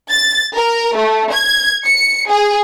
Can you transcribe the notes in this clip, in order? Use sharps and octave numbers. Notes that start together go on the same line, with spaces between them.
A6
A#4
A3
G#6
C#7
G#4